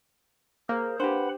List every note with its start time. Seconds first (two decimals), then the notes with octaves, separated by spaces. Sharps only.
0.69 A#3 G#4 C5 F6
1.00 D4 G4 B4 C5 F#5 B5